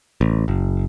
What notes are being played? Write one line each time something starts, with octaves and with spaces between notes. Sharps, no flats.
A1
F#1